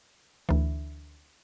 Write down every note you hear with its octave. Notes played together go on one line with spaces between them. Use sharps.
D2 E3